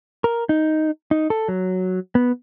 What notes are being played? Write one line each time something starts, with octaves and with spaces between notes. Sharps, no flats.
A#4
D#4
D#4
A4
F#3
B3